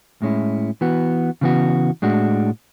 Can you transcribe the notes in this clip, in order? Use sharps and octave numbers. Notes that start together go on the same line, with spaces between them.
A2 G#3 C#4 E4
E3 B3 F#4
C#3 E3 B3 F#4
A2 G#3 D4 F#4